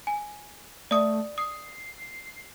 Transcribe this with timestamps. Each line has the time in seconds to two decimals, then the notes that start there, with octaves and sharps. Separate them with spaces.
0.07 G#5
0.91 A3 D5 D#6
1.38 D#6 C7